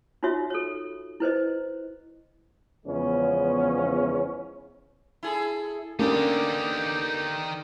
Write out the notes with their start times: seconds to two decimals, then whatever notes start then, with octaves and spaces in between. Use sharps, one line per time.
0.23 D#4 F4 F#4 C#5 E5
0.50 A4 C#5
1.20 E4 B4 C5 D#5
2.86 E2 C#3 F3 G#3 B3 C#4
5.23 E4 G#4 A4
5.99 D3 A#3 B3 C#4 D#4 G4 A4